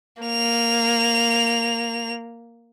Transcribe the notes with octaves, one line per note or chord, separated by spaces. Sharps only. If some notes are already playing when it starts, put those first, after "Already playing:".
A#3 F7